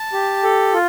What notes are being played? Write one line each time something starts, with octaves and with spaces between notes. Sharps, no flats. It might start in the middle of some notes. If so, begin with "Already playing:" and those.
Already playing: A5
G4
A4
F4